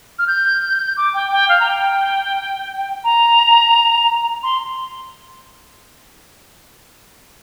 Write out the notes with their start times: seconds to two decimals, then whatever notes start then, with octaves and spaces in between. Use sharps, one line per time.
0.18 F6
0.27 G6
0.97 D6
1.14 G5
1.32 G5
1.49 F5
1.60 A#5
1.65 G5
3.04 A#5
4.43 C6